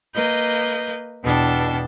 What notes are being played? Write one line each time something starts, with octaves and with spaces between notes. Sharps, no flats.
A#3 B4 D#5 G6
E2 B2 D4 G5 A5